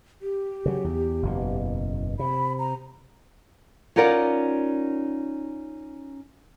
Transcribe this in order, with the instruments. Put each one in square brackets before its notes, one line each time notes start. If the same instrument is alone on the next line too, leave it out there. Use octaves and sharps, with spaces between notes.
[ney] G4
[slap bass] C#3 F#3
E2
F#1 E2 B2
[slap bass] C3 [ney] B5
[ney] A#5
[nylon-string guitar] C#4 D#4 F4 A#4 D5 F#5